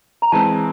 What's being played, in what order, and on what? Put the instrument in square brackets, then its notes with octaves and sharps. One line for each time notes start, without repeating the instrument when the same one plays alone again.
[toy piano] A#5
[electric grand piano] E3 G#3 C4 [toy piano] A5